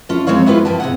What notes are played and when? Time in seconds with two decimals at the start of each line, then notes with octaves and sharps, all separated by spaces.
0.09 C#4 E4 F4 A4
0.27 F2 D3 G#3 C4 C#5 F5
0.46 B3 E4 F4 G4 G#4 B4
0.65 G2 A#3 G4 A5
0.80 C3 G#4 F#5